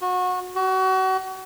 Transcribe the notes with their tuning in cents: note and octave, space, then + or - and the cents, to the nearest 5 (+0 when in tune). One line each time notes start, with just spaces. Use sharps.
F#4 -25
F#4 +30